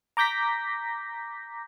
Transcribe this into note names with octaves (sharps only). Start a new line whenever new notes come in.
A#5 D6 G6 A#6 B6